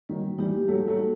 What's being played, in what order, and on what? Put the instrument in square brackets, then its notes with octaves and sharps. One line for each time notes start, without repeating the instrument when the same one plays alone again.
[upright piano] D#3 F#3 [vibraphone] G3
[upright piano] E3 G3 [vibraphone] D#4 G4
[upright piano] F#3 A3 [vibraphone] G3
[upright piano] F#3 A3
[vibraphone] D#4